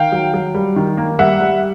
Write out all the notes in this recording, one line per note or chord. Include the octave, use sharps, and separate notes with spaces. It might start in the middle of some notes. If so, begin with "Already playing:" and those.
Already playing: D#3 F5 G5
F#3
F#3
G3
D#3
A#3
G3 E5 F#5
G3